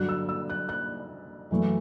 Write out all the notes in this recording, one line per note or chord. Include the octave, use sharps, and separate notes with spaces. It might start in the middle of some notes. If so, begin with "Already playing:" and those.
Already playing: G2 D3 F#3 F#6
E6
E6
F#6
F#6
F#2 E3 A3